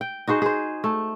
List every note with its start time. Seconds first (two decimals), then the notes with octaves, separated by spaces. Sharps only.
0.01 G5
0.27 D#4 F#4 G#4 C5
0.42 G#4 C5
0.84 A3